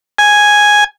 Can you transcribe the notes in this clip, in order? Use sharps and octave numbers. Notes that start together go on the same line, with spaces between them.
G#5